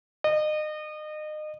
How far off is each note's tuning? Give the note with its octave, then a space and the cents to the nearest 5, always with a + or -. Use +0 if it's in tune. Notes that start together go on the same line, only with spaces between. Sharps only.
D#5 -30